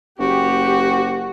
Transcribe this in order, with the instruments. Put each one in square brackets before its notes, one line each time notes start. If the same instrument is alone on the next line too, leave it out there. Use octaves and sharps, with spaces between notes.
[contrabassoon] F#1 [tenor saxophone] F#4 [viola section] G4